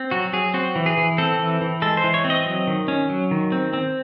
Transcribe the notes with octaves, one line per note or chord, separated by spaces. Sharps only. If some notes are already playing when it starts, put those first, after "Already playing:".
Already playing: C4
F#3 F#4
F#3 G#4
C4 F#4
E3
G#4
E3
C4 A4
E3
E3
G#3 A4
C5
E3
C#5
C4
D#5
F#3
D#3
C#4
F#3
D#3
C4
C4